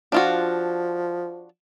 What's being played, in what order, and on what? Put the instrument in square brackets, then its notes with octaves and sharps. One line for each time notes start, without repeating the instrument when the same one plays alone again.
[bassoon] F3 [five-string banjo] D4 F4 F#4